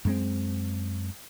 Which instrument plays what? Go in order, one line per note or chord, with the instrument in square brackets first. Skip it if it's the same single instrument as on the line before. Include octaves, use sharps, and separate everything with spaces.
[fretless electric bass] F#2 G#3 C4